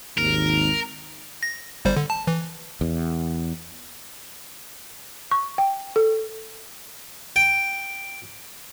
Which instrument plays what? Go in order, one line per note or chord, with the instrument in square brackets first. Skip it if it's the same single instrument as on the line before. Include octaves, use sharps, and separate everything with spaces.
[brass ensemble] G#1 D#2 [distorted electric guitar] A#4
[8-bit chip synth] A#6
G1 G3 C5
D3
A5
E3
[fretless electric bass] E2
[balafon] C#6
G5
A4
[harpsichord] G5